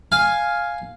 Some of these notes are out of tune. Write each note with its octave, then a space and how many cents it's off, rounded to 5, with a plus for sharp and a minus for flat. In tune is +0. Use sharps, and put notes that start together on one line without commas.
F5 +0 G#5 +0